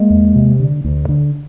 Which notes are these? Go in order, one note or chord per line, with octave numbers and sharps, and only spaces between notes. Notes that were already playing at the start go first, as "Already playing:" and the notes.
Already playing: G#3 A#3
E2
C3
D3
D2
D3